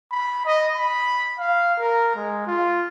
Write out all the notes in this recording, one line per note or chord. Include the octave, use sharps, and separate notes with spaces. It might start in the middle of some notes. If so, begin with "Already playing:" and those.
B5
D#5
B5
F5
A#4
G#3
F4